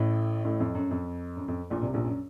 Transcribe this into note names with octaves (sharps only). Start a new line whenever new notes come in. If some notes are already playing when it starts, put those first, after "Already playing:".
Already playing: A1 A2
A1 A2
F2
F#2
F2
F#2
F2
A#1 A#2
C2 C3
A#1 A#2
F#2